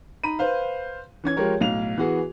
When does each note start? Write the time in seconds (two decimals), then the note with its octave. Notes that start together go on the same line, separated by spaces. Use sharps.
0.24 D#4 A#5 B5 D#7
0.39 B4 C5 F5
1.24 E3 C#4 G#6
1.37 F3 G#3 G4 A#4 C#5
1.61 B1 A2 F5 F7
1.98 E3 B3 F#4 G#4